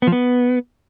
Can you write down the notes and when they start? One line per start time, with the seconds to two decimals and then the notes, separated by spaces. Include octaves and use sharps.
0.02 B3
0.07 F3
0.12 B3